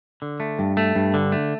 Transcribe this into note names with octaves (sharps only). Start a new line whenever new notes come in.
D3
A3
G2
A3
G2
D3
A3